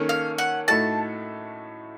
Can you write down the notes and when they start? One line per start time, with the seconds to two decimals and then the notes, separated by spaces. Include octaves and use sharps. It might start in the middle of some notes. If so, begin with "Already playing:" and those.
Already playing: D#3 A#3 C#4 A4
0.09 F5
0.38 F#5
0.68 A2 A3 D#4 F#4 A4 A5